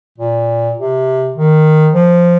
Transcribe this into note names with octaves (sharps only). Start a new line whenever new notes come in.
A#2
C3
D#3
F3